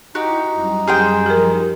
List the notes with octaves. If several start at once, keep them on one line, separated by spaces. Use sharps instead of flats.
D#4 E4 F#4 G4
F#2 G3
G4 G#4 C5 G5
F3 G4 A#4